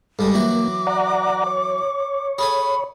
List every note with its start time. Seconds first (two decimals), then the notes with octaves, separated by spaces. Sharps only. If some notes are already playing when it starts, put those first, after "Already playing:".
0.19 G2 G3 G#3 A4
0.34 E3 F#3 A#3 F#4 D6
0.87 D5 F#5 A#5
1.47 C#5
2.38 G#4 A4 G#5 B5